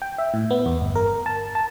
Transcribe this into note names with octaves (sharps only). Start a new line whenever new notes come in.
G5
E5
A2
B3
E2
G1
A#4
A5
A5